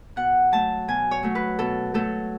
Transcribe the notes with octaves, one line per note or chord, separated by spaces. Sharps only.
B2 F#5
F#3 A3 A5
B2 G#5
C#5
F#3 A3
B4
B2 A4
F#3 A3 A4